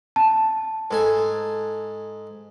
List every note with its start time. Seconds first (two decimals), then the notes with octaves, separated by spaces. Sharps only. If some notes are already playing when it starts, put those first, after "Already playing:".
0.16 A5
0.91 G#2 A4 G#5